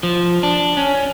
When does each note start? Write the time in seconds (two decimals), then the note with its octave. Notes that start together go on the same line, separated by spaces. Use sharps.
0.03 F3
0.43 D4
0.77 C#4